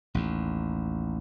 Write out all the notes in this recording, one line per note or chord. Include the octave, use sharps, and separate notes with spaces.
A1 D#2